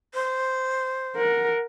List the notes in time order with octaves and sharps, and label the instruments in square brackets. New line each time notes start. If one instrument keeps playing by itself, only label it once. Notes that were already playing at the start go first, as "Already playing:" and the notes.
[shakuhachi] C5
[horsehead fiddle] A#4 F#5